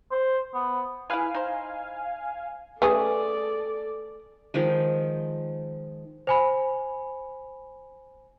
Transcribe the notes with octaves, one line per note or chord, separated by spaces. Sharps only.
C5
B3
E4 G#4 B4 F5 G#5
D#4 C5
A3 C#4 G#4 A4 B4 D5 D#6
D#3 F3 G#3
C5 G#5 B5